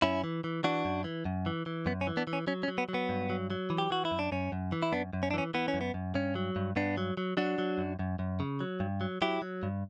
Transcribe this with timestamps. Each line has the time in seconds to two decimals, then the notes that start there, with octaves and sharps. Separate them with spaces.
0.02 F#2 C#4 E4
0.24 E3
0.44 E3
0.64 E3 D4 F#4
0.85 F#2
1.04 E3
1.25 F#2
1.46 E3
1.66 E3
1.86 F#2 B3
2.01 C#4
2.07 E3
2.17 B3 D4
2.27 E3
2.33 C#4
2.47 F#3 C#4
2.63 C#4
2.68 F#3
2.78 B3
2.89 F#3
2.94 B3
3.09 G2
3.30 F#3
3.50 F#3
3.70 E3
3.78 G4
3.90 E3 F#4
4.05 E4
4.11 F#2
4.19 D4
4.32 F#2 C#4
4.52 F#2
4.72 E3
4.83 E4
4.92 F#2 B3 D4
5.13 F#2
5.23 C#4
5.31 D4
5.34 E3 C#4
5.54 E3 B3
5.68 C#4
5.74 F#2
5.81 B3
5.94 F#2
6.15 G2 C#4
6.35 F#3
6.56 G2
6.76 G2 B3 D4
6.97 F#3
7.17 F#3
7.37 F#3 D4 F#4
7.59 F#3
7.78 F#2
7.99 F#2
8.19 F#2
8.40 C#3
8.60 F#3
8.80 G2
9.01 F#3
9.22 F#3 E4 G4
9.42 F#3
9.63 G2